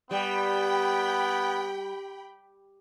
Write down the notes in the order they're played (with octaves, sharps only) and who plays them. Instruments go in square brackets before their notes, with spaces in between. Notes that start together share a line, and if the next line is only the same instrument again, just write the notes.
[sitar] G3 [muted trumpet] B3 [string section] G5 B5